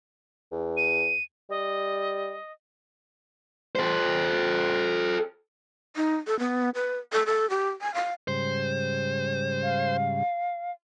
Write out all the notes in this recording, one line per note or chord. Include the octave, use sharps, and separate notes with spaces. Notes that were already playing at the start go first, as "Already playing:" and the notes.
E2
D#7
G3 D#5
A4 C5
D#4
A4
B3
B4
A4
A4
G4
G#5
F5
G#2 C#3 G3 C5
F5